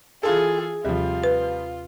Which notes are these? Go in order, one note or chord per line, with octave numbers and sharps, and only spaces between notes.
E3 F4 G#4 A4
D#2 C3 F3 G3 F4
B4